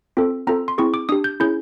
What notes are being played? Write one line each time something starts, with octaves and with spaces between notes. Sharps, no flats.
C4 F4 A4
C4 F4 A4 A#5
C6
C4 E4 G#4 C#6
D6
D4 G4 D#6
G6
C#4 E4 G#4 G6